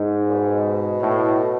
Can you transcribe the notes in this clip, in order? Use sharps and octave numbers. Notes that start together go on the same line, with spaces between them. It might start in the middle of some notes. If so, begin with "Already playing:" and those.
Already playing: G#2
A#2
B2
A2